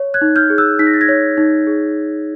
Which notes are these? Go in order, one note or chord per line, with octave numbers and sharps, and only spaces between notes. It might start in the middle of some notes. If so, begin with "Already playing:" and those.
Already playing: C#5
F#6 G#6
D#4
F6 G6
G#4
E6 F#6
D#4 B6
A#6
A6
G#6 A#6
C#5
D#4
G#4